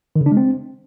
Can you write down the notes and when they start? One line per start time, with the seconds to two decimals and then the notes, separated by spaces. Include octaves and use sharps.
0.16 D#3
0.21 C#3
0.26 D4
0.32 G#3
0.37 C4